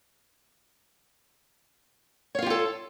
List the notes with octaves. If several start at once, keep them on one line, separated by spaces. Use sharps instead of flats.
F4 G4 A4 C#5 F5